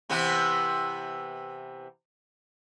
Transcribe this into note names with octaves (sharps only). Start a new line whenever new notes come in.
C3 E3 B3